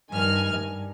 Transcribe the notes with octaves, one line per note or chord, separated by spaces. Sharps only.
G2 D#3 G#5 F6
G2